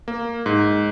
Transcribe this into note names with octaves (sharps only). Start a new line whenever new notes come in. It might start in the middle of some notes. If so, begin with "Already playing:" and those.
A#3
G#2